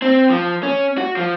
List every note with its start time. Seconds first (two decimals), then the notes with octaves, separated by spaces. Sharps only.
0.02 C4
0.30 F3
0.63 C#4
0.98 F#4
1.17 F3